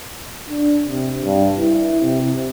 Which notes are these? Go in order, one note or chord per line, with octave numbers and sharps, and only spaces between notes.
D4
C3
G2
E4
C3